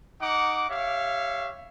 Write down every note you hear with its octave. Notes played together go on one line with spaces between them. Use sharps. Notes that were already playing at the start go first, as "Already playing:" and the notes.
D#4 F#5 D6
G4 C#5 E5 F5